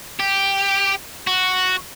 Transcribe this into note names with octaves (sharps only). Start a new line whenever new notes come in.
G4
F#4